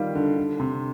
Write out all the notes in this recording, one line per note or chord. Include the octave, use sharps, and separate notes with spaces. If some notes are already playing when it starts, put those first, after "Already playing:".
Already playing: D#3 G3 F4
D3
D3
C3